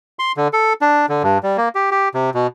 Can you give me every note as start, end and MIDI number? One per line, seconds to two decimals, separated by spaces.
0.19 0.32 84
0.37 0.48 50
0.53 0.73 69
0.82 1.06 62
1.09 1.23 50
1.23 1.38 43
1.43 1.57 55
1.57 1.69 58
1.75 1.90 67
1.91 2.09 67
2.14 2.30 48
2.35 2.47 47